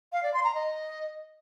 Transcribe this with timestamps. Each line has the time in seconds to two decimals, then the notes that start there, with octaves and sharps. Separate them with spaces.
0.13 F5
0.23 D5
0.34 C6
0.44 A#5
0.55 D#5